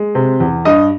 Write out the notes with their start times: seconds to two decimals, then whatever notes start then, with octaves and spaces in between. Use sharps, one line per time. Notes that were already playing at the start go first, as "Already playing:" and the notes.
Already playing: G#3
0.15 C3
0.40 E2
0.65 G2 D#5